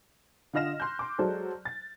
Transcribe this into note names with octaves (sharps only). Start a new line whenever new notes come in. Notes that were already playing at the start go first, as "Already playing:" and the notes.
D3 F4 D#5 F6 A#6 E7
C6 F#6 G6
C6 D6
F#3 G#3 A4 C5 D5
A6